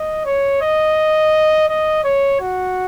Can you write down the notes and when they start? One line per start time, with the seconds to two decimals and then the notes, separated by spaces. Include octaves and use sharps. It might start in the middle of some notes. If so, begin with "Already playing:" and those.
Already playing: D#5
0.25 C#5
0.61 D#5
1.68 D#5
2.04 C#5
2.41 F#4